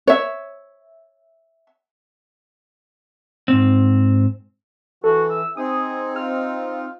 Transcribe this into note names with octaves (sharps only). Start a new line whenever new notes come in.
C#5 E5
G#2 C4
E3 F#4 A4
E5
C4 D#4 G#4 D#6
F4 F6